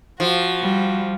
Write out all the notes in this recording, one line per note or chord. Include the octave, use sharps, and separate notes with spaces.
F3 F#4
G3